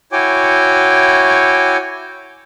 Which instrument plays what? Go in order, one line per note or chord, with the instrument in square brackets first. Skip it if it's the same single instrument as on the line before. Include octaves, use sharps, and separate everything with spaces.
[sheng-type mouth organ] E4 F#4 C#5 G5 G#5 D6